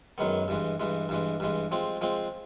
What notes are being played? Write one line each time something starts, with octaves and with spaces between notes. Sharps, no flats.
F#2 D#3 G#3 B3
G2 E3 G#3
G2 E3 G#3
G2 E3 G#3
G2 E3 G#3
F3 G#3 C4
F3 G#3 C4